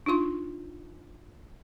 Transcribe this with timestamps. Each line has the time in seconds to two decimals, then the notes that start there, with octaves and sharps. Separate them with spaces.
0.06 D4 D#4 F4 C6